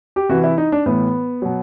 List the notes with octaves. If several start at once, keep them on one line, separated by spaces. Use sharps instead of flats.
G4
C3 E3 F#4
E4
D#4
D4
A2 E3 B3
B2 F#3